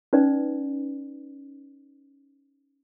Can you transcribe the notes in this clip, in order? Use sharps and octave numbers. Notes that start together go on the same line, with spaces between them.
C#4 D#4 B4 D5